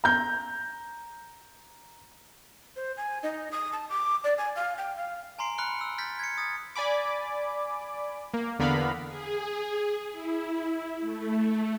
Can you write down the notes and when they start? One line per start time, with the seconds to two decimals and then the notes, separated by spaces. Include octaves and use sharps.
0.04 A#5 G6
2.76 C5
2.97 G#5
3.23 D#4
3.52 D#6
3.73 A5
3.90 D6
4.24 D5
4.38 G#5
4.55 F5
4.78 G5
4.96 F5
5.39 G#5 A#5 C6 C7 D7
5.58 B5 F6 F#6 C#7 G7
5.81 E6
5.98 F6 G6 A6 B6
6.19 G#6 B6 C#7
6.38 D#6 A6
6.76 D5 G#5 B5 D6
8.34 A#3
8.59 E2 D3 B3 A#4 F5 B5
9.07 G#4
10.12 E4
11.01 A3